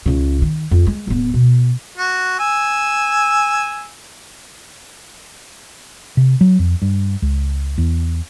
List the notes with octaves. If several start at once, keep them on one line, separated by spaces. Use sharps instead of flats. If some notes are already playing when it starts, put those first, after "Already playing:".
C#2 C#3
D#3
F2
G#3
D1 B3
B2
F#4
G#5 E6
C3
F#3
F2
G2
C#2
E2